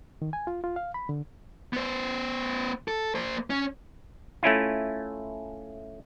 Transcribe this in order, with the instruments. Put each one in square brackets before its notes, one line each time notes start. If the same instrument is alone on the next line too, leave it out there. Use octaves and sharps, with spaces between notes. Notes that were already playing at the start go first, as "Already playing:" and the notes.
[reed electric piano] D#3
G#5
F4
F4
F5
B5
D3
[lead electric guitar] B3 C5
A4
A#3 C5
C#4
[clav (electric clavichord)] A3 C#4 E4 F4